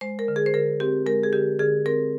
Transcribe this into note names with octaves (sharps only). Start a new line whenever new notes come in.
G#3 C5
A#4
D3
G#4
C5
D3 A#4
C4 G4
G#3 A#4
G#4
D3 G4
D3 G#4
C4 A#4